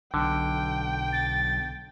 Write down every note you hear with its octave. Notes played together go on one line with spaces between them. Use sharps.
B1 D3 G5
A6